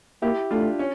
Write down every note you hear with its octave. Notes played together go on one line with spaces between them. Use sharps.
A#3 E4 G4
A3 D4 F4
C#4